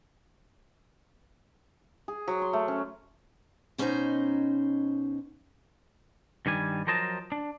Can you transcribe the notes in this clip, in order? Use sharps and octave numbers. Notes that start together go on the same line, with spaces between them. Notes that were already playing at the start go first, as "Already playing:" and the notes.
G#4
F#3
C6
A3
C#4
B2 C#4 D#4 C5 D5 A#5
G2 D#3 G3 G#5
F3 F#3 A#4 C5 D#5 A5
D4